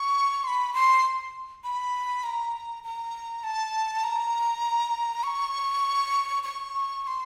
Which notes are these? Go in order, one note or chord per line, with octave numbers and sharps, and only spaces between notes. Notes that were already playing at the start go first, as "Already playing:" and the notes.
Already playing: C#6
C6
B5
C6
B5
A#5
A#5
A5
A#5
C#6
C#6
C#6
C6